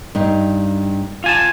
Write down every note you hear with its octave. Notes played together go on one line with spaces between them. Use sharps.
G2 D#4
F4 G#5 A5